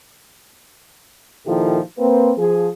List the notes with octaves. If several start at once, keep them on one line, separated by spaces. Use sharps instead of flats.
A#2 D#3 F3 E4 G4 A4
A#3 C4 B4
F3 G#4